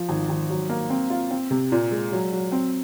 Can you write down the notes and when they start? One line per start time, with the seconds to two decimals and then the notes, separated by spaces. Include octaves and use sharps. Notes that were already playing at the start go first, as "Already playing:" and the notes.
Already playing: F3
0.09 G#1
0.29 G#1
0.50 F#3
0.70 A#3
0.90 C4
1.10 F4
1.31 C4
1.51 C3
1.72 A#2
1.91 G#3
2.12 F#3
2.33 F#3
2.52 C4